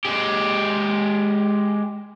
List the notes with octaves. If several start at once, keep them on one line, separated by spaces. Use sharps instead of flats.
G#3 G4